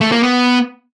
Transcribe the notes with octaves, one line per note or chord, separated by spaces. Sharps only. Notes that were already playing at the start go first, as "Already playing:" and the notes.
A3
A#3
B3